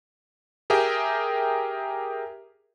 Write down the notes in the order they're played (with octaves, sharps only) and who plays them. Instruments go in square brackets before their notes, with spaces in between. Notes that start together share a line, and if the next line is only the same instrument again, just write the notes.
[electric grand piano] G4 G#4 A#4 E5 G5